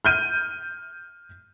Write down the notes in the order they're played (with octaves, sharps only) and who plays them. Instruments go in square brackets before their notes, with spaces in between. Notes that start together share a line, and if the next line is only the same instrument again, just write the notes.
[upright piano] F6 G6 D#7